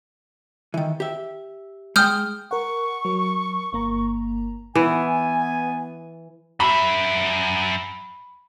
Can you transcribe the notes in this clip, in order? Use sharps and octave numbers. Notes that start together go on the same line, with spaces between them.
D#3 E3
G4 E5
G#3 G5 D#6 F6 G6
A#4 F#5 C#6
F#3 A#4
G1 A#3 A#5
E3 B3 G#5
F#2 E5 B5